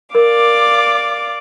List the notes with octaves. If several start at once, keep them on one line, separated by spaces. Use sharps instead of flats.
A#4 D5 F5 D6